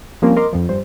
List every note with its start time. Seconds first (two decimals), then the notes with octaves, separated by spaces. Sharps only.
0.22 F3 G3 A#3 C4 C#4 F4
0.37 A#4 D#5 C6 D6
0.53 F2 F3
0.69 G2 C5